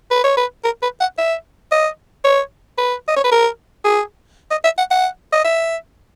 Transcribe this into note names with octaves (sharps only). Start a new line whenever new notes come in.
B4
C#5
B4
A#4
B4
F#5
E5
D#5
C#5
B4
D#5
C#5
B4
A#4
G#4
D#5
E5
F#5
F#5
D#5
E5